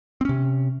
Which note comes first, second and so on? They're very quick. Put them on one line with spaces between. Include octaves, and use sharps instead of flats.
C4 C#4 C3